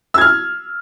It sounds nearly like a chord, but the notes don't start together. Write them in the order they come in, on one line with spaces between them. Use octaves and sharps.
E6 G#6 F6